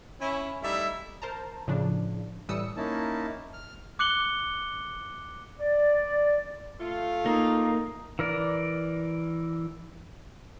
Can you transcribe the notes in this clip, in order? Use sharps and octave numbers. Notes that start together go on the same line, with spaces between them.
C#4 E4
G3 A3 D#4 E4 E5
A#4 C5 A5 A#5
A2 C#3 F3 D4
A2 E3 G3 D#6 E6 C#7
A#3 C#4 D#4 E4 A5
F6
D6 F#6 C#7 F#7 G7
D5
A3 F4
A#3 D#4
E3 A#4 D5